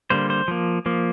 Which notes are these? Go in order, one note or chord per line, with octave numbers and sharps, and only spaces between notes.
D3 G3 A#3 C5
C5
F3 A#3
F3 A#3